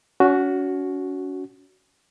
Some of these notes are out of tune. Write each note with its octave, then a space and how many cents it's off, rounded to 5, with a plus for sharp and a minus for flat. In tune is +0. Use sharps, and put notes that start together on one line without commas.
C#4 +30 F#4 +0